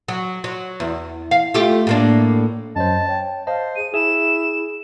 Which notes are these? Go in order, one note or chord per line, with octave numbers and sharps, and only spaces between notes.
F#3
F#3
E2
F5
A3 F4 G4
A2 A#3 D4
F#2 F#3 C5 D#5 A5
C#5 G5
C5 D#5 F5 A5
G#4 D#7
E4 G#4 E5 E7